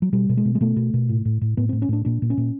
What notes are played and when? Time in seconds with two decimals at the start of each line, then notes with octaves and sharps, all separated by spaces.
0.02 F#3
0.13 B2 G3
0.29 B2
0.37 G#3
0.45 B2
0.55 G#3
0.61 B2 A3
0.76 B2
0.94 B2
1.09 A2
1.25 A2
1.41 A2
1.57 A2 B3
1.69 A2 C4
1.82 C#4
1.89 A2 D4
2.05 A#2 D4
2.22 A#2
2.30 C#4
2.37 A#2